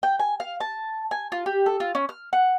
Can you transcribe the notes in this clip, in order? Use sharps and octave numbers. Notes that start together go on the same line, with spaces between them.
G5
G#5
F5
A5
G#5
F4
G4
A4
F4
C#4
F6
F#5